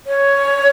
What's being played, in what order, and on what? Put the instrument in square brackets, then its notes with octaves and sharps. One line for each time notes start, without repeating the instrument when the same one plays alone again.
[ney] C#5